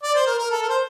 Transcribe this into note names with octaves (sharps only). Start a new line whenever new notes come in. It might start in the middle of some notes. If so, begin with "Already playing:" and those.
D5
C5
A#4
A#4
A4
A#4
C5